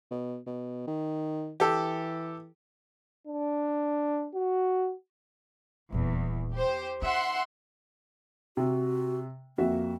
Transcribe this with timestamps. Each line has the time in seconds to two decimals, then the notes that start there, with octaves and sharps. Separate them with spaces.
0.11 B2
0.46 B2
0.87 D#3
1.60 E3 G4 A4
3.27 D4
4.34 F#4
5.92 D#1 E2 A#2
6.54 G4 C5
7.02 D#4 E5 F#5 C6
8.57 C3 F#4
9.58 F2 A#3 F#4 E5